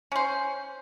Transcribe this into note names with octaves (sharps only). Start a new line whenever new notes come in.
C#4 C5